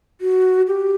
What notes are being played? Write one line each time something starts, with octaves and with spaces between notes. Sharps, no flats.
F#4
G4